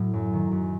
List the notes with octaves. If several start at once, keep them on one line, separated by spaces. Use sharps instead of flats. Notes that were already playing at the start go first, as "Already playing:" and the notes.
Already playing: A2 F#3
F#2
D#3
F#2